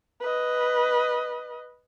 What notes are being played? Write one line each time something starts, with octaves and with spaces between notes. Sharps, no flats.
B4 D#5